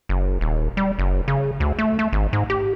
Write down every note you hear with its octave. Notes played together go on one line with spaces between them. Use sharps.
F#1
D#1
G3
F#1
C#3
D2
A3
A3
G#1
G#2
G4